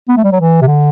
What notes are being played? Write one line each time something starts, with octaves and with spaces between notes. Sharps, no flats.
B3
A3
G3
F#3
E3
C3
D3